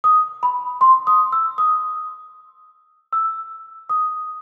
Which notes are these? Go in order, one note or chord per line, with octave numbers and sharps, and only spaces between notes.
D#6
B5
C6
D#6
E6
D#6
E6
D#6